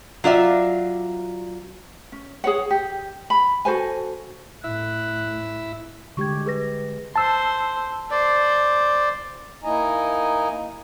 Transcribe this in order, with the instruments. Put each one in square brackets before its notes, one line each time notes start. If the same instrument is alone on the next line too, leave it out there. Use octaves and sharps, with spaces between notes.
[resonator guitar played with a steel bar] F#3 F4 D5 E5
[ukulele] C#4
G#4 C#5 F#5
G4
B5
F#4 A4 C5 G#5
[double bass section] A2 [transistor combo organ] E4 E5 [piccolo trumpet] F#6
[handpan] D3 G#3 G4 [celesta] C#6 G#6
[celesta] G#4 B4 A#6
[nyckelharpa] C5 C6 [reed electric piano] A5 E6
[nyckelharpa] C5 [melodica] D5
[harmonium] A#3 D#4 E4 D#5 G#5 A#5